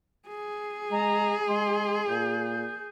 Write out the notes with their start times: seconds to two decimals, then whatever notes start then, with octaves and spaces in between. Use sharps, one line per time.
0.27 G#4
0.92 G#3 A#5
1.48 G#3 C6
2.08 A#2 G6